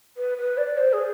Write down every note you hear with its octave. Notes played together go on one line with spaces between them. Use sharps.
B4
B4
D5
C5
G#4